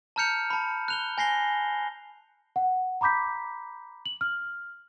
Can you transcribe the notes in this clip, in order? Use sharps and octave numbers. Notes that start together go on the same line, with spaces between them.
A5 A#5 F6 G6 C#7 F7
A5 B5
F#6 F7 G7
G#5 A#6 C7 G7
F#5
A#5 B5 D6 G6 B6
F#7
F6